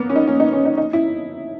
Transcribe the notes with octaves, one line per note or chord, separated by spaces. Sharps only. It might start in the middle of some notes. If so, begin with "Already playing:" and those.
Already playing: A#3 B3
C#4
D#4
C#4
D#4
C#4
D#4
D#4
E4